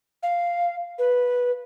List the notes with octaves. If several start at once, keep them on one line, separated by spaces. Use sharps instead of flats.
F5
B4